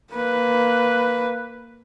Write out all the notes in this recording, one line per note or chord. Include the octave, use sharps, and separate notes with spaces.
A#3 B4